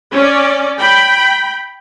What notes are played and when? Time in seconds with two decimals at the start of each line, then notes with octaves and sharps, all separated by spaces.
0.12 C#4 D5
0.79 G5 B5